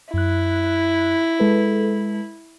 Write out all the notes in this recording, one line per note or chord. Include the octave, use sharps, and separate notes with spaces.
F#2 E4 F#6
G#3 A4 B4